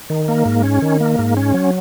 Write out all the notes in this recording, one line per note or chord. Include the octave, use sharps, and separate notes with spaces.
D#3
A#3
G#2
C#4
D#3
A#3
G#2
C#4
F#3